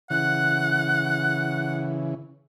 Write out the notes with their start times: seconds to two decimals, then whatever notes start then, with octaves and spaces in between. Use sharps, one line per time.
0.10 C#3 E3 F#5 F#6